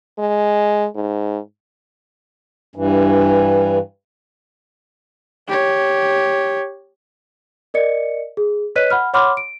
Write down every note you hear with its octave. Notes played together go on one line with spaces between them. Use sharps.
G#3
G#2
G2 E3
G4 C#5
A#4 D5 D#5 C#7
G#4
B4 C#5 D#5 F#6 B6 D#7
F#5 B5 F6
C#5 F#5 B5 C6 D6 F6
D7